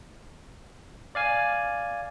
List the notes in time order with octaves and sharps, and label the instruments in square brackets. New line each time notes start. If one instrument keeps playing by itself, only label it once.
[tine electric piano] D5 F5 G#5